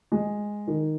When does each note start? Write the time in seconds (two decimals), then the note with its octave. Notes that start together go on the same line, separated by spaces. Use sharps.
0.12 G#3
0.67 D#3